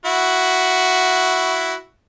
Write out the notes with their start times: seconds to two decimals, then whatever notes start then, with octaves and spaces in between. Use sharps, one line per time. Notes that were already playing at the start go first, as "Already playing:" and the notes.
0.06 E4 F#4